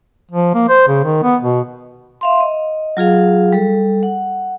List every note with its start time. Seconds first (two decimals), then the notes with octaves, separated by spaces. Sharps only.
0.31 F3
0.54 A#3
0.69 C5
0.88 C#3
1.04 D#3
1.23 B3
1.42 B2
2.21 E5 F5 C6
2.40 D#5
2.97 F#3 F4 G#4 F5
3.53 G3 A4
4.03 F#5